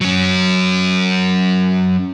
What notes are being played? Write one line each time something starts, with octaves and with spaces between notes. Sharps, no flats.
F#3 C#4